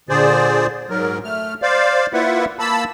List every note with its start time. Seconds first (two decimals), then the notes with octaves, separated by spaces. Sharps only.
0.09 A#2 D3 G#4 C5 D5
0.90 G#2 F#3 A#4
1.24 A3 F6
1.62 C5 D5 F5
2.13 A#3 E4 F4 B4 E5 F#5
2.59 A#3 A5 B5 E6